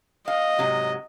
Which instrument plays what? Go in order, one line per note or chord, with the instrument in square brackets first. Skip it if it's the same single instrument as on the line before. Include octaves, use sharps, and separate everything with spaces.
[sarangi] D#5 [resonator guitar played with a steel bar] F5
[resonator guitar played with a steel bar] G#2 C3 F#3